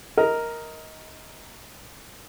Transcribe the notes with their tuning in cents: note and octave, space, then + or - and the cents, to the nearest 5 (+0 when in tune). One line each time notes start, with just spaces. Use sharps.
A#4 +0 D#5 +20